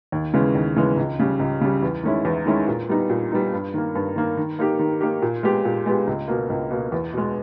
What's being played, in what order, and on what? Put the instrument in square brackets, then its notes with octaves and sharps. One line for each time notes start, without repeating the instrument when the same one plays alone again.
[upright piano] D#2
C#3 E3 G#3 B3
D#2
C#3 E3 G#3 B3
C#2
C#3 G3
C#2
C#3 G3
E2
D#3 G#3 C#4 E4
E2
D#3 G#3 C#4 E4
A#2
G3 B3 D#4
A#2
G3 B3 D#4
G2
D#3 A#3
G2
D#3 A#3
D#3
A#3 D#4 G4
D#3
A#3 D#4 G4
A#2
G#3 B3 G4
A#2
G#3 B3 G4
C#2
B2 A#3
C#2
B2 A#3
E2
B2 G#3